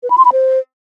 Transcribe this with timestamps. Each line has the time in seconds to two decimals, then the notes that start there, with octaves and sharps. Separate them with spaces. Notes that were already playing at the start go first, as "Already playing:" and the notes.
0.03 B4
0.10 B5
0.18 C6
0.25 B5
0.32 C5